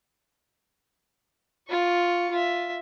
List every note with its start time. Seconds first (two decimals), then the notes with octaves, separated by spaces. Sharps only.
1.69 F4 C#6
2.31 F4 E5